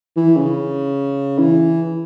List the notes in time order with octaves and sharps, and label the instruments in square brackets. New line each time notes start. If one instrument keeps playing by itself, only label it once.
[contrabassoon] E3
C#3
E3